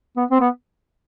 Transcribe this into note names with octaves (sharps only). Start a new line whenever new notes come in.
B3
C4
B3